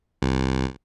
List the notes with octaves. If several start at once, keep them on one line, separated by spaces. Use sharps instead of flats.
C2